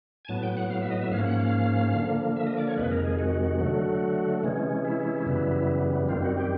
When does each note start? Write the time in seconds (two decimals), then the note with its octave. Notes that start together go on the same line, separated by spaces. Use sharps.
0.25 G#5
0.28 A2 F#3 B3 A5
0.43 G5
0.57 F#5
0.70 F5
0.81 E5
0.90 D#5
1.02 E5
1.11 G#2 F3 A#3 C#4 F5
1.26 F#5
1.39 F5
1.95 D3 F3 A#3
2.36 E5
2.47 D#5
2.57 D5
2.67 C#5
2.77 F2 C3 D#3 G#3 B4
2.91 A#4
3.05 G#4
3.19 F#4
3.61 D3 F#3 A3
4.43 C3 E3 G#3 C#4
4.85 E4
5.27 F#2 C#3 E3 G3 B3
6.08 F#2 D#3 G3 C4 F4
6.23 F#4
6.37 G4